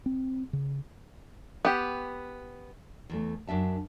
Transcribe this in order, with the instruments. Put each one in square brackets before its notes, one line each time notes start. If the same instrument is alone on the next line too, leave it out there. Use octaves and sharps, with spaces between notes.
[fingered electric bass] C4
C#3
[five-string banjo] B3 G4
[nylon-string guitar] E2 E3 A3
F#2 D4 E5 A5